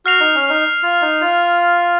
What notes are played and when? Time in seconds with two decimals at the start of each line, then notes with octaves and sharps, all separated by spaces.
0.05 F#4 F6 C7 F7
0.20 D#4
0.35 C#4
0.49 D#4
0.83 F4
1.02 D#4
1.21 F4